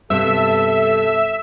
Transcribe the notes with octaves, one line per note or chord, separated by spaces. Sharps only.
G2 C3 B3 A4 E5